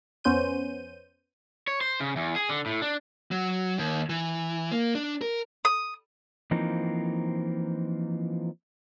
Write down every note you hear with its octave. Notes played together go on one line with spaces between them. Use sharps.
F2 B3 C#4 C5 G6 D#7
C#5
C5
C#3
E2
G#4
D3
A2
D4
F#3
D#2
E3
A#3
D4
A#4
D#6
E3 F3 A#3 C4 D#4